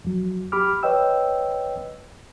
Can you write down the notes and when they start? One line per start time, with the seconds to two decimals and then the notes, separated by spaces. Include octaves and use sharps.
0.05 F2 F#3
0.52 G4 B5 D6 F6
0.83 B4 C#5 D#5 G5 E6